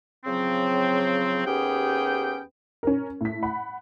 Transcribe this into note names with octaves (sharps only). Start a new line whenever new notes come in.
C#3 F3 F#3 C4
D#2 B3 C#4 G4 G#4 G5
C#4 A#4
A2 B6
F#5 B5